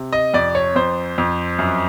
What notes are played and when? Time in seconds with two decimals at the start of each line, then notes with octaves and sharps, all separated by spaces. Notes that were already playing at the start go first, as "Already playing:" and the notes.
Already playing: C3
0.13 D#5
0.34 F2 D5
0.55 C#5
0.76 F2 C5
1.18 F2
1.59 F#2